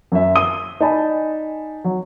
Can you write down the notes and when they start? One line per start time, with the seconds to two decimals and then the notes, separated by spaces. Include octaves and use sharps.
0.12 F#2 E5
0.36 D#6 D#7 G7
0.80 D#4 D5 G#5 A5 B5
1.84 F#3